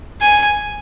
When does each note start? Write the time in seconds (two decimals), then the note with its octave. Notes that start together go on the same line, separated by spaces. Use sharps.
0.22 G#5